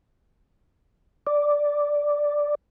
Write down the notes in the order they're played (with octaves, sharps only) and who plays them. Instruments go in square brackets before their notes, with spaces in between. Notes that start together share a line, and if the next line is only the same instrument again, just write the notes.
[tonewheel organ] D5